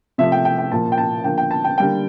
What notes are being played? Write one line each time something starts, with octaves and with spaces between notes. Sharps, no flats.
C3 F3 A3 E5
G5
G5
G5
A#2 F3 A#3 A5
G5
A5
D3 F3 A#3 G5
G5
A5
G5
D3 G3 A#3 G5